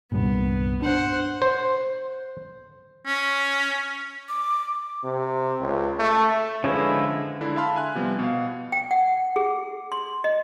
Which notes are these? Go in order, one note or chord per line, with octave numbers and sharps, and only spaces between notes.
C2 G2 A#2 B3
D4 C5 F#5
C5
C#4
D6
C3
C#2
A3
D3 F3 G#3 C#4 E4 G#4 B4
D3 G#3 D4 E4
E5 F5 A5 B5 C6 F6
G#5 F#6
C3 F3 G3 B3
B2 F5
G5
F#5
G#4
C6
D#5